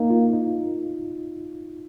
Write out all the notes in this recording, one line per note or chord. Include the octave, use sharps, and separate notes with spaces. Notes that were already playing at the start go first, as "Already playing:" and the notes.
Already playing: A#3 D#4
F4
D#4